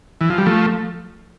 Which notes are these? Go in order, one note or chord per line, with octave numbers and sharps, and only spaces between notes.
E3
F3
G3
F3 A3